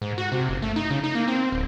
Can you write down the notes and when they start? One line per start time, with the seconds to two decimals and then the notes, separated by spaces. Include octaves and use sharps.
0.02 G#2
0.18 F#4
0.32 C3
0.49 F#1
0.62 A3
0.76 D#4
0.90 C#3
1.04 D#4
1.15 A#3
1.28 C4
1.52 D1